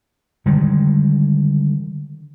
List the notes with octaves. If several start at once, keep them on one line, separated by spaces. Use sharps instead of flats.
D3 D#3 G3 G#3